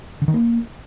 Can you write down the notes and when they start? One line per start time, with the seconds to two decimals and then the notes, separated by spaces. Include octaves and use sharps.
0.22 D3
0.28 D#3
0.34 A#3